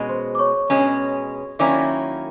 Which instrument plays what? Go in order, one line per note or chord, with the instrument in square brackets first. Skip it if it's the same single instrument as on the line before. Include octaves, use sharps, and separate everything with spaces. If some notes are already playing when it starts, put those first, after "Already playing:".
Already playing: [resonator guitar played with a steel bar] B2 G#3 C#4
[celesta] C5 C6
D6
C#5 C#6
[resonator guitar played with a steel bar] B2 G#3 C#4
[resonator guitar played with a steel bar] D#3 F#3 A#3 C#4 E4 [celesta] D5 D6